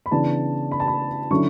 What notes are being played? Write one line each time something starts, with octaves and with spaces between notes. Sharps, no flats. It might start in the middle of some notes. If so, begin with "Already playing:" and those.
B5
C#3 E3 B3 D4 A5
B5
A5
B5
D3 F#3 C#4 E4 C#6